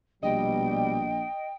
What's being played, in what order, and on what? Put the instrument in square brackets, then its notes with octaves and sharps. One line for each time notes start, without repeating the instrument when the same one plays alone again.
[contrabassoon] A#1 [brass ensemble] B2 G3 [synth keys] D#5 [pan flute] G5